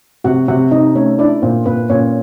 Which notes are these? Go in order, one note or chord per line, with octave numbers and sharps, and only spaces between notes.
C3 F#4 F#5
C3 F#4 F#5
C3 D#4 D#5
A3 C#4 C#5
D4 E4 D5
A#2 C5
A#2 B4
A#2 C#4 C#5